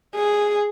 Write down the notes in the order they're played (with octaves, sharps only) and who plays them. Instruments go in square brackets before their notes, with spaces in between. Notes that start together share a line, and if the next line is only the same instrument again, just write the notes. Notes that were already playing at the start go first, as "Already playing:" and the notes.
[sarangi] G#4